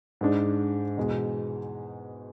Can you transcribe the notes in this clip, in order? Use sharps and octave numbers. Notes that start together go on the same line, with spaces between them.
G#2 G#3 D4
E2 B2 G#3